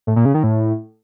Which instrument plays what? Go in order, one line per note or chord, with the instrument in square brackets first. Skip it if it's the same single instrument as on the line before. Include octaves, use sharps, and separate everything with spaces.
[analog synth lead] A2
A#2
C#3
D#3
A2